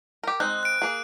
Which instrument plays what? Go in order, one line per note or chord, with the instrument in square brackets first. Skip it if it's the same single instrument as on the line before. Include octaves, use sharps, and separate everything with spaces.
[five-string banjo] G4 A#4
[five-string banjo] G#3 C4 D#4 [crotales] F#6
[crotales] F#6 D7
[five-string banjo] A#3 G#4